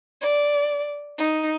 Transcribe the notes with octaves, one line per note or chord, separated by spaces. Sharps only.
D5
D#4